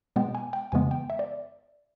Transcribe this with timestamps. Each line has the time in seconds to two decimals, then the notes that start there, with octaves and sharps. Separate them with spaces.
0.16 B2 G#3 B3 G5
0.35 G#5
0.53 G5
0.72 F2 C#3 E3 G#3 B3 G#5
0.91 G5
1.10 E5
1.19 D5